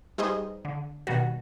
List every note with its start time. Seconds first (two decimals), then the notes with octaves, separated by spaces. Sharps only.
0.18 G3 D#4 G#4 B4 C5 D#5
0.65 D3
1.07 B2 D#3 G3 B3 F#4